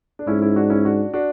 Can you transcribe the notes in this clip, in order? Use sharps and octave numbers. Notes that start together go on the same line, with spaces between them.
D4
G#2 C#4 E4
C#4 E4
D4 F#4
C#4 E4
D4 F#4
D4 F#4